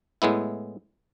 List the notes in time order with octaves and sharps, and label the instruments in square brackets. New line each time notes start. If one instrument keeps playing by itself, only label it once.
[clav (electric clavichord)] A2 G#3 B3 E4